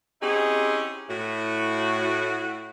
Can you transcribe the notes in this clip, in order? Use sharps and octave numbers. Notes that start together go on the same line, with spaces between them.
C4 C#4 D#4 E4 G4 G#4
A2 F#4